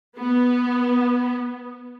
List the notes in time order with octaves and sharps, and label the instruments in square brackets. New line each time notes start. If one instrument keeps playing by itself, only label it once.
[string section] B3